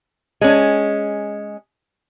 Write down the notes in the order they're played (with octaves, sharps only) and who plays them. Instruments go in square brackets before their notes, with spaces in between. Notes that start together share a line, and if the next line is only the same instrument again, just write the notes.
[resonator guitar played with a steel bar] G#3 C#4